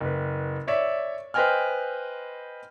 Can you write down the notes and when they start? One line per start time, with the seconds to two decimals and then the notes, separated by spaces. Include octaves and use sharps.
0.01 F#1 B4
0.68 C#5 D5 E5
1.34 B4 C5 D#5 G5 G#5 F6